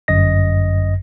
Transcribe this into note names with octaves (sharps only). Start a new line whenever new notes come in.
G1 F#2 D#5 A#6